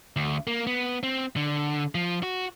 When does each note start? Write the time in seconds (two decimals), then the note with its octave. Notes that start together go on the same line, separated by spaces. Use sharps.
0.16 D2
0.47 A#3
0.67 B3
1.03 C4
1.36 D3
1.95 F3
2.23 F#4